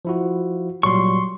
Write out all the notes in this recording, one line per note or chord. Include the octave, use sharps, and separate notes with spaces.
F3 E4 F#4
A#2 F#3 G3 C6 C#6